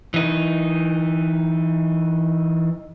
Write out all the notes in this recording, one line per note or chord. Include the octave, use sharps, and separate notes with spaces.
E3 D#4